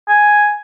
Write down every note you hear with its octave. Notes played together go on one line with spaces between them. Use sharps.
G#5